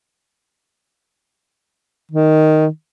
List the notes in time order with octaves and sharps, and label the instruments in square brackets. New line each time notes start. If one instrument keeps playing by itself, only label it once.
[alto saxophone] D#3